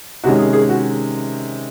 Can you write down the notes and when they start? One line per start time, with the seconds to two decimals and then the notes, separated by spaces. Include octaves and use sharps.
0.24 C3 D#3 G#3 C#4 F#4
0.39 G#4
0.53 G#4
0.69 F#4